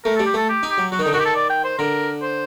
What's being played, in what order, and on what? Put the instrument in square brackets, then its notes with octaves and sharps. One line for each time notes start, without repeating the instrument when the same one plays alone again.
[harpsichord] A3 [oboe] A#4
[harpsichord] G3 [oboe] A4
[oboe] G4
[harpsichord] A3 [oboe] A4
[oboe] G4
[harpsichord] D#4
[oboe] G4
[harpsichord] F#3
[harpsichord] F#3 [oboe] F#4
[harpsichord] D#3
[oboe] D#4
[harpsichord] D3
[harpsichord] D#3 [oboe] F#4
[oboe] G4
A4
D5
G5
C5
[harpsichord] D3 [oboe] A#4
[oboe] C5